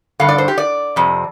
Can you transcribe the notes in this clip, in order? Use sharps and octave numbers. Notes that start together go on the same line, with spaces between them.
G2 D3 F5
D5
C5
G4
D5
F2 C3